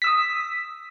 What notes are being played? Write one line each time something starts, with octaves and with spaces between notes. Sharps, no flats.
D#6 E6 B6